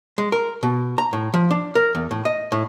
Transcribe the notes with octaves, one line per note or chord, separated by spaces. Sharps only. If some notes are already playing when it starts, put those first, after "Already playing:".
G#3
A#4
B2
A#5
A2
F3
D4
A#4
E2
A2
D#5
A2